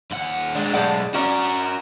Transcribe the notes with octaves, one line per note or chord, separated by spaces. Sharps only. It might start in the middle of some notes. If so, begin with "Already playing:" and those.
D#2 F#5
G#3 D4
B1 A2 G#3 D5 F#5
C#4 F#4 A#4 D5